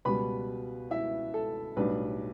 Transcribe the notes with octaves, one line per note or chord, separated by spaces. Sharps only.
C#2 B2 G3 B4 B5
E4 E5
A4
B1 A2 G3 D4 B4